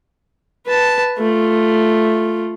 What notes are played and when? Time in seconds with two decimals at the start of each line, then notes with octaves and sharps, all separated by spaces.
0.67 B4 A5
1.19 A3 F4